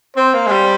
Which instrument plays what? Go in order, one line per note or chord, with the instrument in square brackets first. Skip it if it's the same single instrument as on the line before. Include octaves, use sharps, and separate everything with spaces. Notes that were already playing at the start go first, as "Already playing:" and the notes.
[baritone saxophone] C4 [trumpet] C5
[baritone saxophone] A#3
G#3
G3